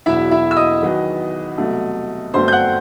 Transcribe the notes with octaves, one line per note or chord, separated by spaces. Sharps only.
E1 E2 B2 F#3 E4 E5
E4 E5
E6
D#5 D#6
E2 D#3 F#3 B3
C2 B2 F#3 A3
G1 F#2 F#3 A3 C4 C5 C6
G6
F#5 F#6